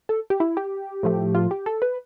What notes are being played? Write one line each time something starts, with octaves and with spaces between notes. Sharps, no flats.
A4
G4
E4
G4
A2 F3 A3
F4
G4
A4
B4